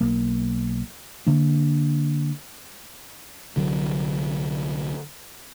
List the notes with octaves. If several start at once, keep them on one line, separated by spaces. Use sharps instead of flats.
B1 A#3
D3 A#3 D4
C2 D3 F#3